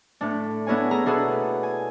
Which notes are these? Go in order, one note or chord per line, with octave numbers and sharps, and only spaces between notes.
A2 D4
B3 D4 E4 A#4 C#5 G#5
E4 G#4 A#5
B2 D4 E4 G#4 A4 B4
G#5